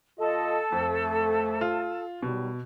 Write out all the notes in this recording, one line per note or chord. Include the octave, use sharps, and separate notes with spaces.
A#2 F4 A4 D#5
F2 A3
F4
B2 D#3 F#3 G3